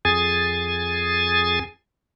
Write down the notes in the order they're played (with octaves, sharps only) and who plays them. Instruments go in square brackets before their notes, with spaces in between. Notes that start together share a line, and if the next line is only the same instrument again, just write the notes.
[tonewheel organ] F2 G#4 G#5 A6